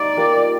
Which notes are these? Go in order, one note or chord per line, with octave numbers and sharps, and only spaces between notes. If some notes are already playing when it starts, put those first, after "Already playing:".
Already playing: D#4 G4 D5 F5
G3 A#3 F4 A#4